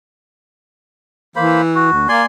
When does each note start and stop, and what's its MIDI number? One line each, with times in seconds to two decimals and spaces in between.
1.36 1.88 52
1.36 1.62 58
1.36 1.62 72
1.36 1.62 83
1.75 2.08 66
1.93 2.07 38
2.09 2.22 58
2.09 2.26 74
2.09 2.26 80
2.09 2.26 84